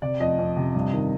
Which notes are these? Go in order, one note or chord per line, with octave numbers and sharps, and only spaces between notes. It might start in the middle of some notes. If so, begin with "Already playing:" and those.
C3 D5
F2 D#5
F2
C3
G2
D#3